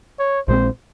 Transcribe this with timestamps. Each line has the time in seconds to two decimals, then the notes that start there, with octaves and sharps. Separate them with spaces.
0.19 C#5
0.48 A#1 A#2 G#3 C4 C5